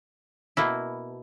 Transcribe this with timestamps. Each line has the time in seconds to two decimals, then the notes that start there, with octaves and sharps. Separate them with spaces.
0.57 B2 A#3 E4